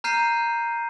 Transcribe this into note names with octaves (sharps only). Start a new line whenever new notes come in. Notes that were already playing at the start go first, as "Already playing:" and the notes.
A#5 F6 G6 C7 D#7